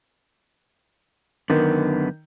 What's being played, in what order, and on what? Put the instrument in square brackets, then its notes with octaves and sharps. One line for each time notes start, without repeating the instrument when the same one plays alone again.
[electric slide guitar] F#2 D3 B3 [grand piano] D#3